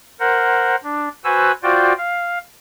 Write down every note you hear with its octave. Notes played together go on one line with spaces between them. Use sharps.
A#4 C5 F#5
D4
F#4 B4 C5 F#5 G#5 E6
F4 F#4 C5 D5 G5
F5